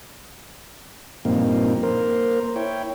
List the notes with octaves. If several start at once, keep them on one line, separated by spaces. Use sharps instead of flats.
G2 A#2 F3 A#3 C4 D#4
A#3 A#4 C5
E4 C#5 G5